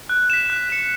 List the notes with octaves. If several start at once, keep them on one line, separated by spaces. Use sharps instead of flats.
F#6
B6 E7
F#6
C#7 E7